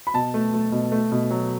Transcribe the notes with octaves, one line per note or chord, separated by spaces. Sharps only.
B5
B2 A5
A3
A3
B2
A3
B2
F#3